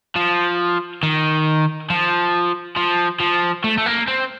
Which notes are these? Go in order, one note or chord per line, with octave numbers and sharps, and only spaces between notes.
F3
D#3
F3
F3
F3
A3
A3
A#3
C4